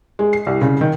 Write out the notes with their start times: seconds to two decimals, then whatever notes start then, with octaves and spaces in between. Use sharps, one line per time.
0.19 G#3
0.33 C7
0.46 C2
0.62 C#3
0.81 D#3